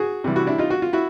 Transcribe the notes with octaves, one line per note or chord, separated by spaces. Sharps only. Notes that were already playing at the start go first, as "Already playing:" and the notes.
Already playing: F#4 G#4
C3 E3 G3
E4 F#4
D4 E4
D#4 F4
F#4
F4
E4 F#4